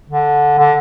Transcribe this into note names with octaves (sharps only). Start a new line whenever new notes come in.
D3
D3